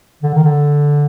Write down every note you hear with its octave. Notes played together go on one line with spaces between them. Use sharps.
D3
D#3
D3